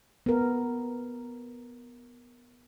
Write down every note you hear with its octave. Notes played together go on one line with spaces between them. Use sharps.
B3 A#4